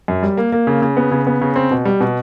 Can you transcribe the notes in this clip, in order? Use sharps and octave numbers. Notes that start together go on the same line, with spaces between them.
F#2
G3
A#3
A#3
C#3
C#3
B3
C#3
B3
C#3
C4
B2
G3
B2